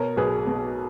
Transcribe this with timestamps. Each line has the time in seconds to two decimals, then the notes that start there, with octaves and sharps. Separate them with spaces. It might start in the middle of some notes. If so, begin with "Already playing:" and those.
Already playing: B2 A#4 C#5
0.17 B1 G#4 B4
0.47 B2